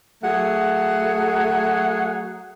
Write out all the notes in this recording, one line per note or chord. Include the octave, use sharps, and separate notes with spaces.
F#3 A3 G#4 F#5